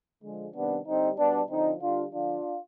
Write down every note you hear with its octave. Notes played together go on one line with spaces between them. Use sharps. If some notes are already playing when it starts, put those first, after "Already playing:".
D3 F3 G#3
C3 D#3 G3 B3 D4
D3 G3 C4 D#4
B2 G3 B3 D4
D3 F3 C4 D#4
D3 G3 D4 F4
D3 F3 D4 F4